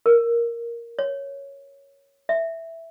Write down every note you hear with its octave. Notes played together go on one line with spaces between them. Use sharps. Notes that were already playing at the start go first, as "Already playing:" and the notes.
A#4
C#5
E5